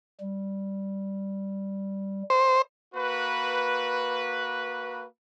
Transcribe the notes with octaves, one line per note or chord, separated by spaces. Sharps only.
G3
C5
A#3 F#4 B4